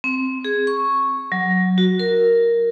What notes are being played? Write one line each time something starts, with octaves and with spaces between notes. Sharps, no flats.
C4
G#4
C#6
F#3
F#4
A#4